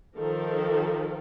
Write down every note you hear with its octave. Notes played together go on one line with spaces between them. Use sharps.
D#3 F3 A4 A#4